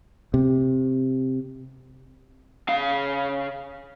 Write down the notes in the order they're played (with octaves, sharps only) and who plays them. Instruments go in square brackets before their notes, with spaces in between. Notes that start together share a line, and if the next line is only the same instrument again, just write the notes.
[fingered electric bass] C3
[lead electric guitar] C#3 F5